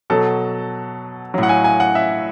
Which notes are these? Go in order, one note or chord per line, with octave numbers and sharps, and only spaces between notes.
B2 F#3 A4
A2 F#3
F#5
G#5
G#5
F#5
E5